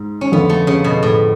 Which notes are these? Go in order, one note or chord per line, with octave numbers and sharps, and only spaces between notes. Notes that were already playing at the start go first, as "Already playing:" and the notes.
Already playing: G#2 G#3
C#4
F2 D3 F3 B3
A3
C#3
B2
A2